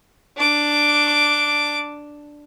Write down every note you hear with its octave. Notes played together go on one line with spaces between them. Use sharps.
D4 D6